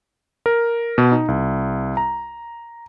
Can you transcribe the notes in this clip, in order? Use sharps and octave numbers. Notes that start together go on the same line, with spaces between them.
A#4
B2
D#4
C2
A#5